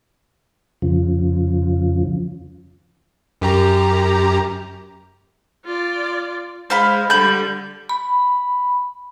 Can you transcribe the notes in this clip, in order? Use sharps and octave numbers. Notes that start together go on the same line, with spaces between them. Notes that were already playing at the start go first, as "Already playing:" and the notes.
F2 C#3 F3
F#2 G4 A#5
F4 D5
G#3 C5 F5 B5
D3 G3 B5 G6
B5